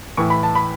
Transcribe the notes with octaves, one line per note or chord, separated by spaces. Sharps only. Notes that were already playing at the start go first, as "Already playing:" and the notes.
A2 E3 C#6
B5
A5
B5